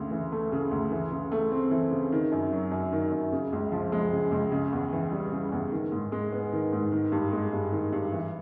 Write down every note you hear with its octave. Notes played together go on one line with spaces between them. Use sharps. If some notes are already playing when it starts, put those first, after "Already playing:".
Already playing: D2 C#3
E3
A3
C#3
D2
E3
C#3
A3
C4
E3
C#3
D#3
F#2
F#3
F#2
D#3
F#2
C#3
C#2
F3
G#3
C#3
C#2
C#3
E2
E3
G3
C#3
E2
D#3
G#2
G#3
B3
D#3
G#2
D#3
G2
G#3
G2
D#3
G2
E3